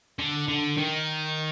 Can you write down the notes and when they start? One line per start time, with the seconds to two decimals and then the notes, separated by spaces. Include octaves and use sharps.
0.19 D3
0.48 D3
0.78 D#3